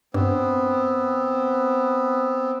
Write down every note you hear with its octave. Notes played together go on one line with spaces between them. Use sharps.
G2 B3 C4